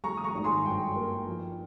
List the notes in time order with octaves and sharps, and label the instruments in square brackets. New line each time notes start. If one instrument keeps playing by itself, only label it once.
[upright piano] G3 A#5 C#6
D#6
A#5 C#6
G#1
G#5 C6
G2 G5
A#3
F3